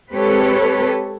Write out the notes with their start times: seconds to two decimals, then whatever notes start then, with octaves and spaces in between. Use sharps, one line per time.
0.12 G#3 C4 G4 A4 B4 C#5